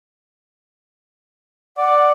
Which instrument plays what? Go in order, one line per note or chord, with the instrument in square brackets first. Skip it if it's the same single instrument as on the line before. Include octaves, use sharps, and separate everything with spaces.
[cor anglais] D5 [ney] F#5